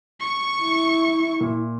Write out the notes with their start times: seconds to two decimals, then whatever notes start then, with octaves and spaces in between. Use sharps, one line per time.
0.20 C#6 C#7
0.62 E4
1.41 A#2